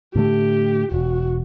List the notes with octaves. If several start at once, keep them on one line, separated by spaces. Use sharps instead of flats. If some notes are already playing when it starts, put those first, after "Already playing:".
A2 D3 A3 G4
E1 F#4